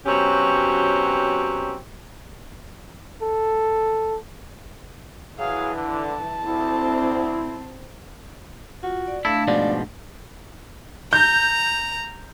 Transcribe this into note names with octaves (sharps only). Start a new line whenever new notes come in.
B2 F#3 C4 C#4 G4
A4
E3 F#3 G#4 F5
D3 A5
D2 C4 E4
F4 F#4
D5
A3 D4 E4 F5 A5
G#2 B2 F3 D5
A#5 G6